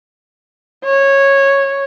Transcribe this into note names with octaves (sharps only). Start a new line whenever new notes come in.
C#5